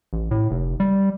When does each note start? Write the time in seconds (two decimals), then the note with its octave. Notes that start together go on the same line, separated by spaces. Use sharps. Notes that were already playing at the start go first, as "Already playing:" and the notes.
0.13 A1
0.31 A2
0.51 F1
0.80 G3